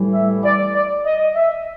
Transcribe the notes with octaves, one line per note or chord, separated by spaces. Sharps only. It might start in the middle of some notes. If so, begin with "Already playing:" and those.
Already playing: A2 E3 G3
E5
D5
D5
D#5
E5